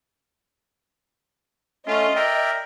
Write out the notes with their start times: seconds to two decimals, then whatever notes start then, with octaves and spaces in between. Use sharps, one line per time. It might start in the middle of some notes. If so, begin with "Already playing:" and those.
1.87 A3 C#4 F4 D#5
2.16 A#4 D5 E5 G5